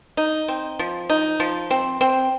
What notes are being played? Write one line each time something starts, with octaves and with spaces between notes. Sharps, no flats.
D#4
C4
F3
D#4
F3
C4
C4